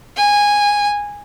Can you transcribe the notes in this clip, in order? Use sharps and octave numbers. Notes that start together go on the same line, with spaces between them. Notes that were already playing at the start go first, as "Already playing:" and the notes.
G#5